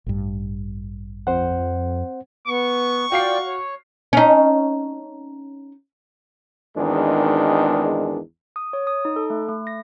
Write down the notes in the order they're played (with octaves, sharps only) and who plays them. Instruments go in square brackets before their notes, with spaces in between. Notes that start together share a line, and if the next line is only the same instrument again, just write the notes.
[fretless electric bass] A1 G2
[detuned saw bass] F2 [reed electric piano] C4 C5 F#5
[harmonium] B3 [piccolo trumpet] C#6
[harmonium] F4 D5 G5 [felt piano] F#4 F5 C7
[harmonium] C#5
[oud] C#4 D#4
[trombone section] G#1 E2 D#3 G#3 D4
[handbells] D#6
C#5
D#6
D#4
A4
A3
A3
A#6